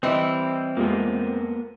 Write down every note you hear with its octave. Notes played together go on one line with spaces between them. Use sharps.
E3 G3 C4 E4 D#5
F2 G#3 A#3 B3